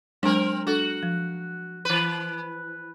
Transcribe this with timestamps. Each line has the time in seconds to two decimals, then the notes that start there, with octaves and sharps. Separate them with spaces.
0.23 F#3 G#3 C4 D4 A#4
0.67 D4 F#4 A4
1.03 F3
1.85 E3 B4